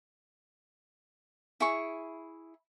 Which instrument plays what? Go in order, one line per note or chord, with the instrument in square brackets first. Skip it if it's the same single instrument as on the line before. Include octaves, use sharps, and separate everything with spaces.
[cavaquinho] E4 G#4 C#6